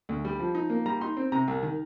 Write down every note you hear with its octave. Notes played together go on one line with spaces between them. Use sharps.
D2
G3
F3
D#4
A#3
G3 A#5
D#4 C6
C4
C3 A#5
C2
D#3